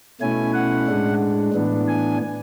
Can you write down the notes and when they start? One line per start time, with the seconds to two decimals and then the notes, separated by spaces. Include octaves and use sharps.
0.21 B2 A3 C#4 E4 G#5
0.54 F#5
0.87 A2 G#3 D4
1.54 A2 E3 B3 D4
1.88 G#5